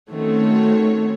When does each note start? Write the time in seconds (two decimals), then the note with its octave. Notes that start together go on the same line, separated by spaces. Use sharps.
0.11 D#3 A3 C4 C#4 F#4 C#5